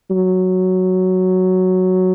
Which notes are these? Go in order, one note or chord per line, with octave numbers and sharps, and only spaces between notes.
F#3